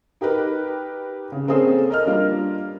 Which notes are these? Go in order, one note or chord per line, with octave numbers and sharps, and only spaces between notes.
D#4 G4 A#4 B4
C#3
A#3 C4 C#4 G#4 A4 C5
A#4 D#5 F6
G3 A#3 D4 F4